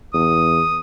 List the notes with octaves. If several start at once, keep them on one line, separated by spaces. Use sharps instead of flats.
E2 D#6